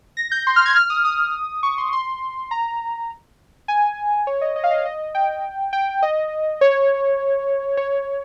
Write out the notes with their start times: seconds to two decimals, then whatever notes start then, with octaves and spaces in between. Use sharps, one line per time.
0.17 A#6
0.32 G6
0.47 C6
0.56 F6
0.66 G#6
0.76 F6
0.90 D#6
1.05 D#6
1.63 C#6
1.78 C6
1.93 C6
2.51 A#5
3.68 G#5
4.27 C#5
4.41 D#5
4.56 D#5
4.64 F5
4.71 D#5
4.78 F5
4.85 D#5
5.15 G5
5.73 G5
6.02 D#5
6.61 C#5
7.77 C#5